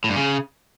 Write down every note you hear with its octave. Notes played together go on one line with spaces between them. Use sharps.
A2
G2
C#3